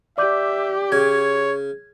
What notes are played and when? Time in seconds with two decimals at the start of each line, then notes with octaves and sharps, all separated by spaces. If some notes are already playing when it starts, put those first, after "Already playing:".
0.18 G4 D5 E5 D6 G6
0.92 C#3 C#5 G#6